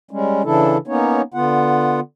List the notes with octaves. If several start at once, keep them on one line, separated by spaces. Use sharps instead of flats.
G3 G#3 C#4
C#3 E3 D4 E4 A4
A#3 B3 C#4 D#4 C#5
D3 B3 F4 F#5